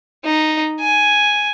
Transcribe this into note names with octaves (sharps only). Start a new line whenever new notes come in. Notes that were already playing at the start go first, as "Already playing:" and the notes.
D#4
G#5